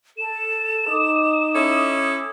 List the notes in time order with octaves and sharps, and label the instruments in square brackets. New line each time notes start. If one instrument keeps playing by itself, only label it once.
[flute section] A4 [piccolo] E7
[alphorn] D#4 [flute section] D6 D#6
[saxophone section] C#4 E4 A4